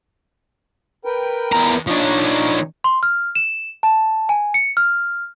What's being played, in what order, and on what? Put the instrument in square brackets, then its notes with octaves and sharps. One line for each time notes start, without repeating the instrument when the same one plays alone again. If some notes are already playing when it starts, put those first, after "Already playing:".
[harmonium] A#4 B4 G5
[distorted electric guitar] E2 A#5
[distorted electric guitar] F3 D4 [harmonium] D#4 C#5
[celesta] C6
F6
E7
A5
G#5
C#7
F6